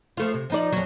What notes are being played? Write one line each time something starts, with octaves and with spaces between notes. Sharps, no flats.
F3 A3 F4
C3
F3 D#4 D5
F2 F#3